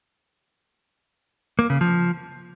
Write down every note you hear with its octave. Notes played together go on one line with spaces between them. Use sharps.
A#3
C#3
F3